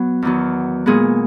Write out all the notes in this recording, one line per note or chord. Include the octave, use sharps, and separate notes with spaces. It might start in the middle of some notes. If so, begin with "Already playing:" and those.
Already playing: F#3 B3
E2 D#3 F#3 B3
A#2 G#3 B3 G#4